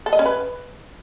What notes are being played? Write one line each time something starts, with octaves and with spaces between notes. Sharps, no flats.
A4
D#5
C#4
B4